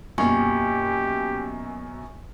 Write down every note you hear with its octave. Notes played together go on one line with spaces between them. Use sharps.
F#2 B2 A#3 F4 G4 G#5 C#6